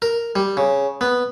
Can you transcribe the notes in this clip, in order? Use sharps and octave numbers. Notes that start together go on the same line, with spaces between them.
A#4
G3
C#3
B3